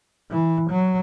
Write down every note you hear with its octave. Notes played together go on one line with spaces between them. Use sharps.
E3
F#3